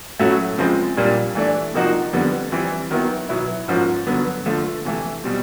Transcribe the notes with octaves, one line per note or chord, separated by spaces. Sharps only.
A2 F#3 A3 C#4 F#4
C#3 F3 G#3 C4
A#2 G3 A#3 D4
E3 A3 D4
C3 F3 A#3 D#4 F#4
F2 D3 G3 B3
E3 G3 C4 E4
D#3 F#3 B3 E4
B2 F#3 B3 E4
G#2 F3 A#3 C#4 F#4
G2 D3 F#3 B3
D3 F3 A3
C3 E3 A3
B2 G3 C4